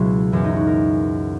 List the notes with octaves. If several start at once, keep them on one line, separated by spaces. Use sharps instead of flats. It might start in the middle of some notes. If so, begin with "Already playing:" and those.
Already playing: C#2 B2 F#3 E4 F#4
F#2 E3 C#4
D#4
F#4
A#4